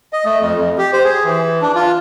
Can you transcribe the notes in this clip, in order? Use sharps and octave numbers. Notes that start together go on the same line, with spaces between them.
D#5
A3
F2
F2
G4
C5
G#4
E3
D4
F4